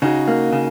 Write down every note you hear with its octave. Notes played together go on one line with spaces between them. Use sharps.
C#3 D#4 F#4
A#3
C#3